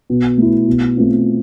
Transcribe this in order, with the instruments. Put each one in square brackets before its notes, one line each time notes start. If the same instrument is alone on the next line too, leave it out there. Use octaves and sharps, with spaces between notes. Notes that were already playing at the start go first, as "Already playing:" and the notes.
[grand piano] B2
A3 E4
B2
A3 C4 F4